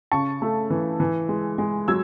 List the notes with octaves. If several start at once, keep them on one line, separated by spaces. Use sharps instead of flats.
C#3 A5 C#6
A3
E3
E3
G#3
G#3
F#3 E6 G#6